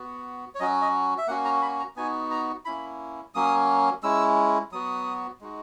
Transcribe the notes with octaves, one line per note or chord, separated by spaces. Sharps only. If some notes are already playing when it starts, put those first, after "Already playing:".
Already playing: B3 F#4
C#5
F#3 C#4 F#4 D#5
D#5
E5
A#3 C#4 F#4 F#5
A#5
B5
A#5
B3 D#4 F#4 G#5
A#5
A#3 C#4 E4 B5
F#3 A#3 C#4 D#6
G#3 C#4 E4 E6
F#3 B3 F#4 D#6
G#3 D#4 F#4